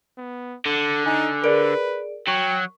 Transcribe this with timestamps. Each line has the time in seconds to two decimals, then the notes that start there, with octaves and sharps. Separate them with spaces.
0.18 B3
0.66 D3 A4
1.06 D#4 G#5
1.44 G#4 A#4 B4 D5 D7
2.28 F#3 G5 C#6